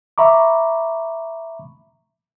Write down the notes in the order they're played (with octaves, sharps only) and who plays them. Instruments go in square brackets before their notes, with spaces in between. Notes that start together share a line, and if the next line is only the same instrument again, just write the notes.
[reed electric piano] E5 A#5 B5 C#6 D6